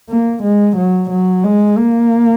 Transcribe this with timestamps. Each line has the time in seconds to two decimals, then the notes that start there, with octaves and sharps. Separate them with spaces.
0.09 A#3
0.43 G#3
0.77 F#3
1.10 F#3
1.44 G#3
1.77 A#3